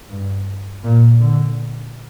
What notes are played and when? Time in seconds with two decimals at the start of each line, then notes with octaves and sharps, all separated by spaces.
0.10 G2
0.84 A#2
1.20 D3